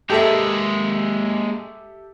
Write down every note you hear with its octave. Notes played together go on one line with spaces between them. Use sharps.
G#3 A#3 G4 A4 E5